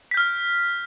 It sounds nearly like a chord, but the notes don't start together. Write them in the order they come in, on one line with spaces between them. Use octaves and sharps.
B6 G6 F6